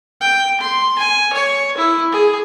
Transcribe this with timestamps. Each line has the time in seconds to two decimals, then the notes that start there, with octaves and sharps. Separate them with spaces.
0.21 G5
0.61 C6
0.98 G#5
1.33 C#5
1.78 E4
2.12 G#4